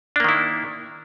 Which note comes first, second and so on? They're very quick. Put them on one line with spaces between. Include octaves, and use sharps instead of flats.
D4 A#3 D#3 E4